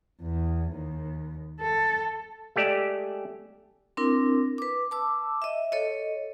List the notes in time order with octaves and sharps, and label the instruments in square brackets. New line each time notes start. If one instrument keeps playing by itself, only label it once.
[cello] E2
D#2
A4
[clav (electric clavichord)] G#3 A3 G4 D5 E5
[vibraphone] C4 D4 E4 A#4
B4 D6
A5 D6 E6
D#5 E5
A4 C#5 D#5